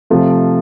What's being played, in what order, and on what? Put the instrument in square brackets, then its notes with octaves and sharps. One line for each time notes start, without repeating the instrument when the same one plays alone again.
[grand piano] C3 F3 A3